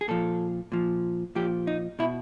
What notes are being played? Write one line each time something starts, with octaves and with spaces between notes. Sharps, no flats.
G#4
A#2 F3 A4
A#2 F3
A#2 F3 G4
D#4
B2 E4